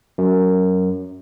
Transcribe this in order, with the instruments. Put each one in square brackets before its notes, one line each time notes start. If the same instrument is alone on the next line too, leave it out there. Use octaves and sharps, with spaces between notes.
[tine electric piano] F#2